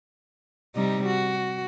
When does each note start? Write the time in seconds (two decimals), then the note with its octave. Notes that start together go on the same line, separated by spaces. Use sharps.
0.75 C3 G3 D#4
1.06 F#4